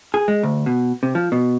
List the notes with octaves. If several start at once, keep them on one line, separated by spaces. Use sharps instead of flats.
G#4
G#3
D2
B2
C3
F3
B2